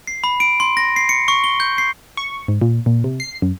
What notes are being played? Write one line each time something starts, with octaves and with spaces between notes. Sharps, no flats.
C7
B5
D7
C6
A#6
C7
C#7
C#6
G7
G6
C7
C#6
G#2
A#2
A#2
C3
C7
F#2